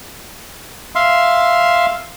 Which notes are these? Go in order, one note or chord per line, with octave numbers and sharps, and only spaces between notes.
E5 F5 C6